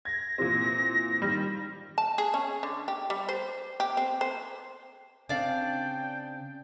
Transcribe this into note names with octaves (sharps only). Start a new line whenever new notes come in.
G#6 A#6
A#2 E3 C4
D#3 G3
A5
G#4
C#4
D3
G4
G3
C5
G4
C4
C5
C#3 C4 D4 D5 F5 G5